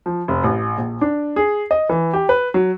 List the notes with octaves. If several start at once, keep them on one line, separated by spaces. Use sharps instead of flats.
F3
F1
A1
A#1
D4
G#4
D#5
E3
G4
B4
F#3